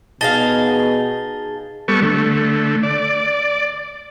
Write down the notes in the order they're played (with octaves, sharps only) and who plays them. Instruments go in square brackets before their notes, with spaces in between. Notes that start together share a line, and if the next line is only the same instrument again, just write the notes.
[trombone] B2 [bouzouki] D#4 G#4 F5 [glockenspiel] A5 A6 G7
[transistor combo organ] G3 B3 A4 C#6
D3 A3
D5